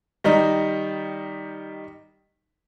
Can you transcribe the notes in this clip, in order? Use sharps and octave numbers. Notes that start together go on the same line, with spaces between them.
D#3 G3 D#4